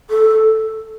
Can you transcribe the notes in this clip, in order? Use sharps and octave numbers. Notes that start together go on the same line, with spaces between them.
A4